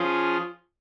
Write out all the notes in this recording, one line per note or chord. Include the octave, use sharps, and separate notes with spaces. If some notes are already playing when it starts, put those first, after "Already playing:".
Already playing: F3 C#4 F4 G#4